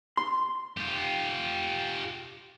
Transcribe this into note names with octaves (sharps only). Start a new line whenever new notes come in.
C6
F4 G4